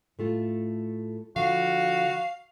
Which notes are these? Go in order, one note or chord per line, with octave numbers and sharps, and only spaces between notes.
A2 A3 F4
D3 F3 F#4 F5